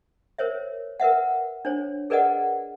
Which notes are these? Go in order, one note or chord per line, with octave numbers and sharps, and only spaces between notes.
A#4 C5 C#5 E5
A#4 B4 E5 F#5
D4 C5 C#5
G#4 A#4 B4 D5 D#5 F#5